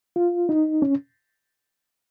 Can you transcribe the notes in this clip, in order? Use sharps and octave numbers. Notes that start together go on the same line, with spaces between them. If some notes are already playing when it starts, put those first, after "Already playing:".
F4
D#4
C#4